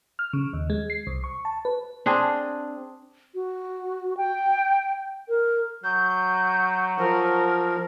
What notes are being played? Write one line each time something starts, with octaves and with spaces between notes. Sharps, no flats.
F6
C#3
D#2
G#3
C7
C2
C#6
A5
B4
C4 D4 G#4
F#4
G5
A#4
F#3 G6
F3 A#4